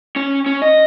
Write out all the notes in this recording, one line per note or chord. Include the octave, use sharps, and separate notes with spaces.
C#4
C#4
D#5